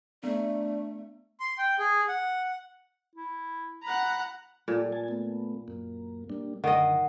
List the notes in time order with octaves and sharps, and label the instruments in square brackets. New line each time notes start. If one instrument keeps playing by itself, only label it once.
[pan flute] A3 [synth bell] B3 [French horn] D4 [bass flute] D5
[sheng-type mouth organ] C6
G5
G#4
F#5
[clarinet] E4
[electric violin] F#5 A#5 [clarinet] B5
[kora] A#2 [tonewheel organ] G3 A4
[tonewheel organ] G#5 A5
A3 B3
F#2 A#3
G3 A#3 D4
[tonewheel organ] F#2 D3 [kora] D#3 D#5 [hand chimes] F#5